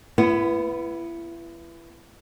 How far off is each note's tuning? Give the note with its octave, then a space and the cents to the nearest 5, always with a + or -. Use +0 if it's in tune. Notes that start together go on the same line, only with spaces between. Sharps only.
B3 +0 E4 +35